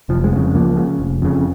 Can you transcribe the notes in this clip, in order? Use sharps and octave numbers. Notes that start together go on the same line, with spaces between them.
F1 F3
G#3
F2 C#3 F3
C#2 F3 A#3
C#3
F1
F2 C#3